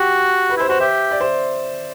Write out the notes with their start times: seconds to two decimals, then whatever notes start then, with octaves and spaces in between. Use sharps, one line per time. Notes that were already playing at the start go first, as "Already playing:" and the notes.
Already playing: F#4 G4
0.50 B4
0.57 E4 C5
0.69 F#4 C5
0.80 G4 E5
1.11 D5
1.21 C5